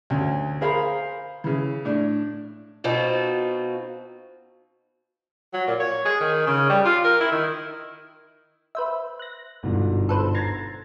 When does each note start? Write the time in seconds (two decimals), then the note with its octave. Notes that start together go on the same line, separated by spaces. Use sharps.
0.10 D2 C#4
0.61 G#4 A#4 C5 F5 B5
1.44 C#3 E3
1.85 A2 D4
2.84 B2 C4 D#4 F4 F#4
5.54 F#3
5.67 A#2
5.80 C#5
6.05 G#4
6.20 D#3
6.47 C#3
6.69 G3
6.85 F4
7.04 A#4
7.20 E4
7.31 D#3
8.75 B4 C5 E5
9.19 F#6 A#6
9.63 G1 G#2 B2
10.09 A4 B4 C5
10.35 A#5 G#6 A6 C7